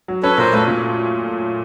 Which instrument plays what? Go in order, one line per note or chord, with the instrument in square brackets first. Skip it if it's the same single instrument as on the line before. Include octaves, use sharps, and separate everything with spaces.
[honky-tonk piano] F#3
[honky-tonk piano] C#4 [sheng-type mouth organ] A4 B4
[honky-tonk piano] A#2 [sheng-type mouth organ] A#4 C5
[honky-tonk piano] A3 [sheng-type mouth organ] A4 B4
[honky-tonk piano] A#2